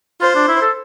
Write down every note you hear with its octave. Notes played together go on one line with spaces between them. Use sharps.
F4 C5
D4
E4
A4